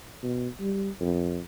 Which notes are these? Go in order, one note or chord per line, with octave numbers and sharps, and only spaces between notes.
B2
G3
F2